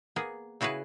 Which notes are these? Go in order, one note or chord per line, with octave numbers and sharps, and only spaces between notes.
A#3 B3 G#4
C#3 E4 F#4 G#4 B4